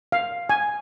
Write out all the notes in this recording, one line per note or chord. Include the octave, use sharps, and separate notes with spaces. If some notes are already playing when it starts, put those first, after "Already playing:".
F5
G#5